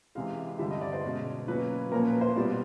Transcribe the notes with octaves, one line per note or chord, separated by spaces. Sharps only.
C3 E3 G#3 F5
G2 D3 G3 E5
D#5
D5
C5
B2 G#3 C#4
B2 F#3 A#3 C#4 B4
A#2 F3 A#3 C#4 A#4
B4
C5
B2 G3 B3 D5